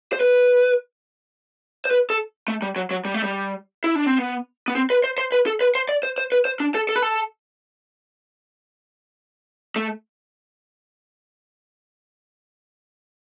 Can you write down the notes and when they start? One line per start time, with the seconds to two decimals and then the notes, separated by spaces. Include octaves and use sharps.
0.13 C5
0.21 B4
1.85 C5
1.91 B4
2.10 A4
2.48 A3
2.62 G3
2.76 F#3
2.91 F#3
3.05 G3
3.14 A3
3.24 G3
3.84 E4
3.95 D4
4.06 C4
4.18 B3
4.68 B3
4.76 C4
4.90 B4
5.04 C5
5.18 C5
5.32 B4
5.46 A4
5.61 B4
5.75 C5
5.89 D5
6.03 C5
6.18 C5
6.32 B4
6.45 C5
6.60 D4
6.75 A4
6.89 A4
6.96 B4
7.02 A4
9.76 A3